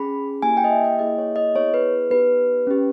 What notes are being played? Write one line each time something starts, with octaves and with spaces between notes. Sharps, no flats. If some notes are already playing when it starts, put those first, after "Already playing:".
Already playing: C#4 G#4 B5
A#3 E4 G4 G#5
G5
D#5
E5
D#5
A#3 E4 G#4 D#5
C#5
D#5
B3 E4 G#4 C#5
B4
B3 D#4 G4 B4
C#4 G4